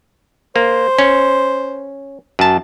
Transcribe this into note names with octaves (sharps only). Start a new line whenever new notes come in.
A#3 C5
C#4
F#2 A5